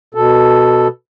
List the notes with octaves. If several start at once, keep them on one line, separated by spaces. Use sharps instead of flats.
B2 A4